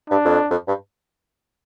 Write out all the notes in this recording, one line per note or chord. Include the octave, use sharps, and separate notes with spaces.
G2 D4
F2
F2
G2